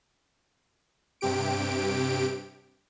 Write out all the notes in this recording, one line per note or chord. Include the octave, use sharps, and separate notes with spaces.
G2 C3 G4 D7